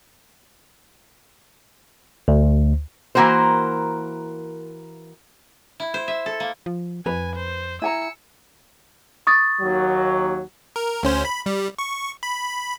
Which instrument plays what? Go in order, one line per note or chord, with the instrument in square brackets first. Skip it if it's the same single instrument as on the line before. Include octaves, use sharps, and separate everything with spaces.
[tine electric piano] D2
[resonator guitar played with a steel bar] E3 A#3 F#4 A#4 C5
[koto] E4
C5
E5
A4
A#3
[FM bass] F3
[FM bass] F2 [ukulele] B4 [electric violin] G#5
[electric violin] C5
[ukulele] E4 G#5 A#5 [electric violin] E6 C#7
[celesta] C#6 D#6 A6
[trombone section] D#2 F#3
[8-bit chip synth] A#4
D2 C#4 C5
B5
G3
C#6
B5